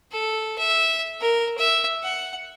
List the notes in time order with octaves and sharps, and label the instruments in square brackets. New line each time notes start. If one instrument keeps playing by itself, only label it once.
[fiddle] A4
E5
A#4
E5
F#5